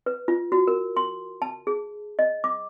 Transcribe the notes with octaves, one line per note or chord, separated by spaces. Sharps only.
B4
F4
F#4
A#4
C6
A5
G#4
D#5
D6